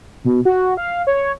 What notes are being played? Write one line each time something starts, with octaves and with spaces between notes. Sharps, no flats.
B2
F#4
F5
C#5